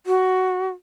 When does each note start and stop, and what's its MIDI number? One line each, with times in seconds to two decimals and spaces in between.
0.06 0.68 66